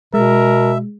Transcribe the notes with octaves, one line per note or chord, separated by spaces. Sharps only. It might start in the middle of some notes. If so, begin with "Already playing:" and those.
B2 G#3 A#4 E5